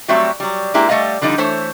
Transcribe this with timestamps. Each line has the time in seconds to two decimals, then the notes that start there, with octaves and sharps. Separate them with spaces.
0.08 F#3 G3 A3 C4 F#4 E5
0.40 F#3 G3
0.74 G#3 A#3 E4 G4
0.89 G3 A3 C5 D#5 F5
1.21 D3 F3 G3 D#4
1.38 E3 A3 C5 C#5